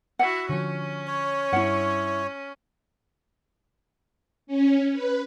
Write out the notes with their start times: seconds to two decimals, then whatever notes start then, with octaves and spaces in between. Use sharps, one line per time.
0.19 E4 F#4 F#5
0.49 D3 F3 C#4
1.07 C#5
1.53 G2 E4 F#5
4.47 C#4
4.93 B4